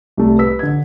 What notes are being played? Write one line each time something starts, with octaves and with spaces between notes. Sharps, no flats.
C2 A3
B4 E6 B6
D3 G#6